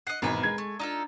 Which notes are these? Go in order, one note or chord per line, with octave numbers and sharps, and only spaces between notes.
D#5 F#5 C7
G#1 E2 B2 A#4 B4 G#5
G#3 G#6
A3
D4 D#4 F4 A4